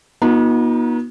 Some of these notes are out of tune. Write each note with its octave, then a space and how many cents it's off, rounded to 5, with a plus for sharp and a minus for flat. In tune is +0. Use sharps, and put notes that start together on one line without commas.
B3 -40 D#4 +15 F#4 -45